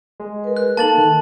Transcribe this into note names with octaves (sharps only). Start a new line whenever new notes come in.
G#3
A#4 B4
F#6
A#3 D#4 A4 A5 A6 F#7
D#3